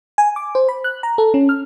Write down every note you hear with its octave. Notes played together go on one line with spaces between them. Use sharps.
G#5
D6
C5
B5
F#6
A#5
A4
C#4
F6